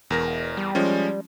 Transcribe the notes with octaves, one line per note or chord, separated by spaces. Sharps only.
E1 E2 A#4 A#6
G3
F3 G#3 C#4